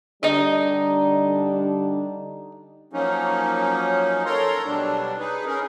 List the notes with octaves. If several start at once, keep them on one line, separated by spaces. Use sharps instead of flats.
D3 G3 D4 D#4 D#5
F3 F#3 A#3 C#4 D#4
A4 A#4 C#5 A#5 C6
B2 F#3 G3 D4
D#4 G#4 B4
C#4 D#4 G#4 A#4